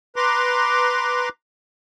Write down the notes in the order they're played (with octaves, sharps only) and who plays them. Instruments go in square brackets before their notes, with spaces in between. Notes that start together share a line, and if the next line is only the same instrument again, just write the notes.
[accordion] B4 A#5 C6 D6